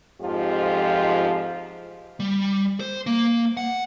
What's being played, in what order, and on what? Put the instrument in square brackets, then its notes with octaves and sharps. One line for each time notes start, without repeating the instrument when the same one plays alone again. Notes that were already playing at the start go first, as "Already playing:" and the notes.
[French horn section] F2 G#2 F3 F4 G4
[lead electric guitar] G3
C5
A#3
F#5